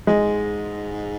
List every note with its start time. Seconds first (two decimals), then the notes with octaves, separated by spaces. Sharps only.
0.07 G#2 G#3